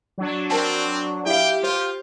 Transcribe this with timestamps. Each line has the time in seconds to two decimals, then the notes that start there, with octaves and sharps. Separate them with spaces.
0.18 F#3 D4
0.50 C4 A#4 C5 A5
1.26 E4 G4 F5 G5
1.63 F4 C5